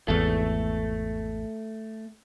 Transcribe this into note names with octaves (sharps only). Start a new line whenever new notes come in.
G#1 E2 A3 A4